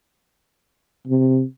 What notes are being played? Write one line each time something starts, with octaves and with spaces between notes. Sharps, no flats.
C3